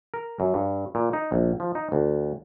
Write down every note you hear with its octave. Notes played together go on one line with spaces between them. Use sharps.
A#4
F#2
G2
A#2
D#4
A#1
F3
D#4
D2